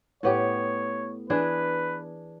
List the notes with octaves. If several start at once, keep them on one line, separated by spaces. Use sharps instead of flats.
A2 B3 G4 C#5
E3 D4 G#4 B4